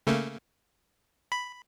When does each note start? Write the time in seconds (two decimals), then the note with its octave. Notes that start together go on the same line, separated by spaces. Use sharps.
0.07 C#3 A3 A#3
1.32 B5